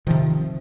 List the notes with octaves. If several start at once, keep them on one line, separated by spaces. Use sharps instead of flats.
C3 D#3 F3